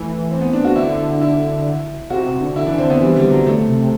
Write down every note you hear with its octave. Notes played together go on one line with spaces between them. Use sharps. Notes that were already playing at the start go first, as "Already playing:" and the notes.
Already playing: E3 A3
C4
B3
D4
F#4
D3 E4
E4
C3 F#4
C3
D3
D3 E4
E3 D4
D3 C4
D3 B3
E3 G3
D3 G3
D3 F#3
D3 A3
C3
C3